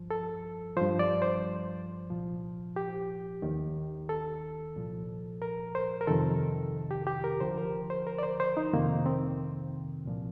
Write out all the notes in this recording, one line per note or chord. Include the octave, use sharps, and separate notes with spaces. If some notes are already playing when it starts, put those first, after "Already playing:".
Already playing: G2 F3
A4
G2 F3 C5
D5
C5
C2 A#2 F3
G4
D#2 D#3
A4
C2 A#2 F3
A#4
C5
A#4
F2 C3 D#3 A4
G4
G4
A#4
D2 D3 F3 C5
A#4
C5
A#4
D5
C5
C5
D#4
F2 C3 D#3 A#3
C4
C2 A#2 F3